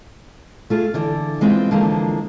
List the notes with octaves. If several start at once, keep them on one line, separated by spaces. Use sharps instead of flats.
A3 F4 G#4
D3 E3 D4
E3 G#3 C4 F4
D3 E3 F3 G#3 A#3